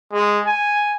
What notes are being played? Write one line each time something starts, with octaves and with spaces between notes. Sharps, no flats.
G#3
G#5